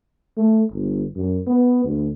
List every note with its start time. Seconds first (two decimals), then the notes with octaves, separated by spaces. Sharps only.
0.37 A3
0.72 G1
1.16 F#2
1.47 B3
1.85 D2